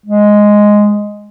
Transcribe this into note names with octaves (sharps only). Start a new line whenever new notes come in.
G#3